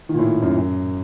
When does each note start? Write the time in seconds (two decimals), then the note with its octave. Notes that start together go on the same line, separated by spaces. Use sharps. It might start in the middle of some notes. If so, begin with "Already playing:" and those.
0.09 D#3
0.14 A#2
0.19 A2
0.42 F#2
0.56 F#2